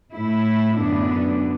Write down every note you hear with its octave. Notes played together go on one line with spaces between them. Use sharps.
A2 A3 E4
F#2 D3 B3 D4